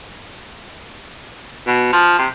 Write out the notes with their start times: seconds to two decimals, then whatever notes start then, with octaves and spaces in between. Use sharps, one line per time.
1.67 B2
1.93 F3
2.19 C3